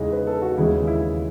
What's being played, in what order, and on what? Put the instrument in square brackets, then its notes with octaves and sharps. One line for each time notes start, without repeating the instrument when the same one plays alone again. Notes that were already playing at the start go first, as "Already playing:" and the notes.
Already playing: [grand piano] E2 C#3 E3 G#3 D#4 [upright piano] C#5 D#5
[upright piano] B4
A4
F#4
[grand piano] D#2 C#3 E3 G#3 [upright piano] E4
[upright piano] E4